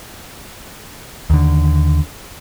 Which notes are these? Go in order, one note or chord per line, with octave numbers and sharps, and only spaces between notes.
D#2 D3